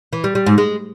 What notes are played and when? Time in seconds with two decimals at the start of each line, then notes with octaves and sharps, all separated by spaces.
0.13 E3
0.24 G3
0.35 G3
0.46 G#2
0.58 G#3